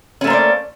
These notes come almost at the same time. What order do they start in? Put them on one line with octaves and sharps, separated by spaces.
C#4 A3 A#3 C5 D5